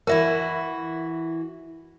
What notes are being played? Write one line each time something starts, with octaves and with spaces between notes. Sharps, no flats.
E3 E4 F#4 A#4 E5